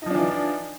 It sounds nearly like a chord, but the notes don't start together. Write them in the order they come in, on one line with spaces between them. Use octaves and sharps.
D#4 F3 D4 E3